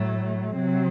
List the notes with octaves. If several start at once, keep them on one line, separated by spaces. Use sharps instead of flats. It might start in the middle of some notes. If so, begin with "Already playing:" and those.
Already playing: A2 F#3 A3
C3 F#3 C4